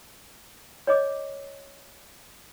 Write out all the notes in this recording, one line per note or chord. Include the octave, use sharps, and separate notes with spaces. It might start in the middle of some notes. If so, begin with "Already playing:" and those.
C#5 D#5 D6